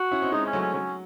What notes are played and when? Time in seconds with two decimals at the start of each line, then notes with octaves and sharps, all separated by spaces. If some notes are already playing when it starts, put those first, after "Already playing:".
Already playing: F#4
0.12 C#4 E4
0.22 C4 D#4
0.32 G#3 C4 D#4
0.46 C#4
0.53 F#3 A3
0.60 C#4
0.74 F#3 C#4